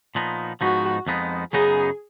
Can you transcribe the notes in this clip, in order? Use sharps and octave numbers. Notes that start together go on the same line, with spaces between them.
A#2 F3 B3 D#4
G#2 F3 B3 D#4 F#4
F2 F3 G#3 B3 D#4
F#2 C#3 F#3 B3 D#4 G#4